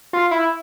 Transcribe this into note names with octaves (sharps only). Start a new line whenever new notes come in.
F4
E4